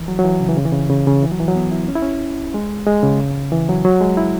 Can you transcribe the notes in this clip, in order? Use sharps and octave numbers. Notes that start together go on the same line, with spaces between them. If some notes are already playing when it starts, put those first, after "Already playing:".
Already playing: E3
F#3
F#3
E3
C#3
E3
C#3
E3
C#3
C#3
C#3
E3
F#3
E3
F#3
B3
E4
C#4
E4
C#4
G#3
G#3
C#3
E3
F#3
F#3
G#3
E4